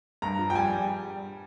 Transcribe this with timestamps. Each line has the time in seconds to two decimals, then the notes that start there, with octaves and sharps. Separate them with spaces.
0.22 G2 A#5
0.39 F3
0.50 G5
0.55 G3 G#5
0.73 G3